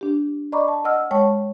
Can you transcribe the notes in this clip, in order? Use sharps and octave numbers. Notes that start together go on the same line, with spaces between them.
D4 G4
D5 D#5 A#5 B5 C#6 D6
A5
D#5 F#5 E6 F6
G#3 C#5 G5 A5 C#6